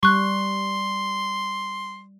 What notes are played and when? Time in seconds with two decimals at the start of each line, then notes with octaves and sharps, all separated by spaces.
0.03 G3 C6 C#6 F#6